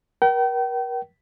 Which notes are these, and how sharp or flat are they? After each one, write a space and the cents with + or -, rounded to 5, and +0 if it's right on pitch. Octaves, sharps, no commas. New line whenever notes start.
A#4 +40 G5 -35